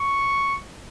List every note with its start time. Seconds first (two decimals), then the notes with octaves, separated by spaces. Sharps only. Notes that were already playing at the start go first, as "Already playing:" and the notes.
Already playing: C#6